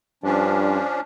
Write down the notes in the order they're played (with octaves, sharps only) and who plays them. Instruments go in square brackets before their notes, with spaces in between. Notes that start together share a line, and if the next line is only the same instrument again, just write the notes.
[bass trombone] G2 [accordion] F3 C#4 D4